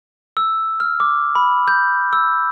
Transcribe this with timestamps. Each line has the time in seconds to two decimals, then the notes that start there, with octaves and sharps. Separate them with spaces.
0.37 E6
0.80 F6
1.00 D6
1.35 B5
1.68 G6
2.13 E6